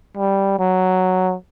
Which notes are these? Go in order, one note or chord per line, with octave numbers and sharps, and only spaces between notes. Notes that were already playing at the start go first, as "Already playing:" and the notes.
G3
F#3